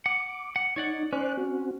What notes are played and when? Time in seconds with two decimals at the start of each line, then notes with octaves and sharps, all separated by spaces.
0.06 F#5 D6
0.56 F#5
0.76 D#4 C#5 D5 F#5
1.13 C#4 C5 D5 F#6
1.37 C4 F#4